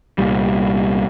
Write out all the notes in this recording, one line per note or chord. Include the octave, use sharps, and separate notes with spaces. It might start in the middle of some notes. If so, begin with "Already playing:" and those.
C2 A#2 G3